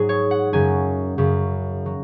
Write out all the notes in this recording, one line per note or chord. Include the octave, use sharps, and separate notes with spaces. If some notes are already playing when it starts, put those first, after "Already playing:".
Already playing: G#2 F#3 G#4
C#5
F#5
F#2 C#3 F#3 G#5
F#2 C#3 F#3
F#3